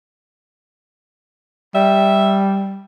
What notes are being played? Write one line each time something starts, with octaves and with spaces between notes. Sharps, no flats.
G3 E5